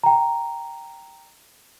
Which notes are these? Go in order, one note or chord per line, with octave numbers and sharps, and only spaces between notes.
G5 A#5